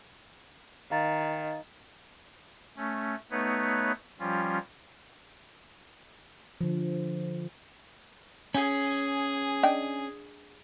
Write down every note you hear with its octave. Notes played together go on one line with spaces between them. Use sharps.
D#3 F5 A#5 A6
A3 C#4
A3 B3 D#4 B4 C#5
F3 G3 C#4 F4
D3 F3
C#4 G#4
D4 D#5 G5